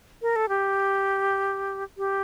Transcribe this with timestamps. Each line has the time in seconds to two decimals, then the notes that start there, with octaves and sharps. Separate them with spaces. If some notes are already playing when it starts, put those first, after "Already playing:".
0.22 A#4
0.36 A4
0.49 G4
1.98 G4